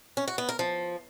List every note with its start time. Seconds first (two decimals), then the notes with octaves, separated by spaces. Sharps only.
0.17 C#4
0.28 F#4
0.38 B3
0.49 A#4
0.59 F3